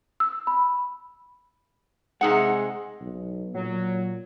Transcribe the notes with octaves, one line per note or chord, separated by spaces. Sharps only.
E6
B5
C3 G#3 D#4 G#4 F#5
B1
A#2 F#3